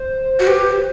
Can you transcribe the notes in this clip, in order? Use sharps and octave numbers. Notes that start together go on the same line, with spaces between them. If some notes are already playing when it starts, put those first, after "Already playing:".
Already playing: C5
F#4
G4 B4
B4
C5